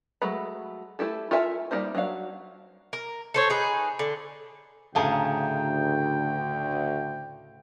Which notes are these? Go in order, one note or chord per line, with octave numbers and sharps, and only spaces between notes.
F#3 G#3 A3 A#5 B5
A3 E4 G4 A4
F4 A4 A#4 E5 G#5
G3 A#3 D#4 C5
F#3 D4 C#5 F5
A#4
A4 C5 C#5
D#4 G#4 B4
D3
D2 A2 C#3 G#4 F5 G5 A5 A#5